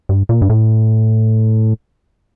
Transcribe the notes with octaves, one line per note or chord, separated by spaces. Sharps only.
G2
A#2
G2
A2